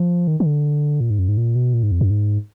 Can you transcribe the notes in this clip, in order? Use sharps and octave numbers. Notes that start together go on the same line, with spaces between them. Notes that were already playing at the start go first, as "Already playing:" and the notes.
Already playing: F3
D#3
D#3
D3
A#2
G#2
F#2
G#2
A#2
B2
A#2
G#2
F2
F#2
G#2